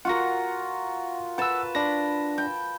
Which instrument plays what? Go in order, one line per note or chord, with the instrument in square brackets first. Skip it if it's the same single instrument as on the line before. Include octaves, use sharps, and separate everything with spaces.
[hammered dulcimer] F4 F#4 A#4 [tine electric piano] F#5 A#6
[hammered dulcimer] B4 A5 [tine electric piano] F#5 E6
[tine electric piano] D4 A#6 [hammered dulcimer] B5
[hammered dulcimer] G5